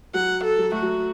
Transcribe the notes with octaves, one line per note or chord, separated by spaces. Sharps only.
F#3 F#5
A4
F#3
A3 F#4
F#3